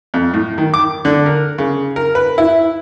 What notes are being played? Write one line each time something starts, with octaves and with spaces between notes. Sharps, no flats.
F2
A2
D#3
D6
D3
A#4
C#3
A#4
B4
E4